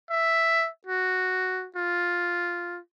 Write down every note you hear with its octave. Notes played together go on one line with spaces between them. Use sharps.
E5
F#4
F4